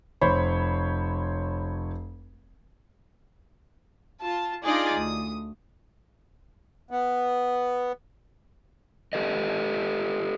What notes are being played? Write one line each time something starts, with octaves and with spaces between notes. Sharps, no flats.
F1 C5 C#5 B5
F4 A5
D4 D#4 F4 G#4 D5 D#5
D2 D#6
B3
G4 A4 B4 D#5